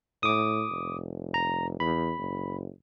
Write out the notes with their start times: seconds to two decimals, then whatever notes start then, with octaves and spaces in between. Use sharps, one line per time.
0.23 A2 D6 D#6
0.70 F1
1.34 A#5
1.80 E2 B5
2.19 F#1